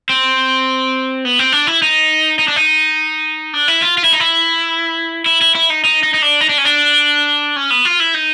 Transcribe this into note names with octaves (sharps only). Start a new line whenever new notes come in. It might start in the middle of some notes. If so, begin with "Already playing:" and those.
C4
B3
C4
D4
E4
D#4
D#4
D4
D#4
D4
E4
F4
F4
E4
D#4
E4
E4
E4
E4
D#4
D#4
D#4
D#4
D4
D#4
D4
C#4
D4
C#4
B3
F4
E4
D#4